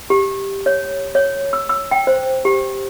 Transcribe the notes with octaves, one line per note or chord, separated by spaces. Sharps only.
G4
C#5
C#5
E6
E6
G5
C5
G4